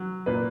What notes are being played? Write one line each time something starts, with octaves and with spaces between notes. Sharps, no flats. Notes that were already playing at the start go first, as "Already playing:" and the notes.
Already playing: F#3
A#2 B4